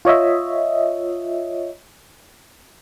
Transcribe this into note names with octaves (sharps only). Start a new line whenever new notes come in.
F4 C#5 D#5 E5